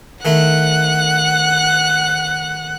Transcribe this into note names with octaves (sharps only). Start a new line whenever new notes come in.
D#3 A3 E4 F#5 F#6